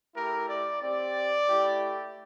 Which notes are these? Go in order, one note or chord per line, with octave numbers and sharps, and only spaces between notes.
A3 E4 G4 A#4
D5
C4 G4 D5
A3 E4 G4